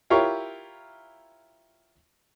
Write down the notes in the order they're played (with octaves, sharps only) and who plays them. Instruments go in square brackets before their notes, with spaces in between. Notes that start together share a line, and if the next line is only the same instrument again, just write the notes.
[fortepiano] E4 F4 G4 A#4 C#5